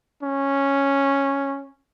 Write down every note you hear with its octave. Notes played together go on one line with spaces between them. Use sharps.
C#4